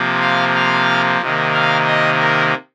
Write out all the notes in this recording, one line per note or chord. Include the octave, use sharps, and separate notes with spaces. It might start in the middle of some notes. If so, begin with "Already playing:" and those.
Already playing: C3 F3 A#3
F5
F5
C3 D#3 A#3
F5
D#5
A#4